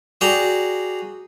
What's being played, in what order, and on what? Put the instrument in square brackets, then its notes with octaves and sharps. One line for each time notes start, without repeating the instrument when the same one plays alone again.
[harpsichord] F#4 G#4 D5 G5 A#5